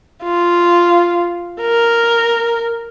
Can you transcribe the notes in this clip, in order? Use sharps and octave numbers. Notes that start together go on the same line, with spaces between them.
F4
A#4